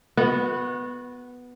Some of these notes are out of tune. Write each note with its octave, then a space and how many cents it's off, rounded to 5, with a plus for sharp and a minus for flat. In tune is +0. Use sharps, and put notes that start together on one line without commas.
B3 +0 F#4 -30